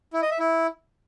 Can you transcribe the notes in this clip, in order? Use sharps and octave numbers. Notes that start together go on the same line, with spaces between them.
E4
D#5
E5
E4